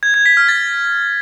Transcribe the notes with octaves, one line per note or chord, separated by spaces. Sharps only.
G#6
G#6
B6
F6
A6